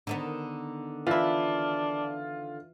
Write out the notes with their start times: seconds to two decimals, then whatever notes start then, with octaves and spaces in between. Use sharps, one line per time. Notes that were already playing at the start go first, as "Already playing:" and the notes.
0.07 D3 D#3 B3
1.07 E3 D4 E4 F4